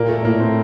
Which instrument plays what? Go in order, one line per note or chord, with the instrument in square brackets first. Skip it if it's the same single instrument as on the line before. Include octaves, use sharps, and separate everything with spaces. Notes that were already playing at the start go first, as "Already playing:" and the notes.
Already playing: [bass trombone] A#2 [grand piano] A#3
[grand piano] A3
[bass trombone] A2 [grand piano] A#3
[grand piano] C4